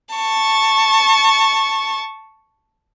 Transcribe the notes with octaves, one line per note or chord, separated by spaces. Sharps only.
A5 C#6